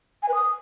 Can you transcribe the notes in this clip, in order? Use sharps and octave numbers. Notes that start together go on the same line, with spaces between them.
G#5
B4
D#6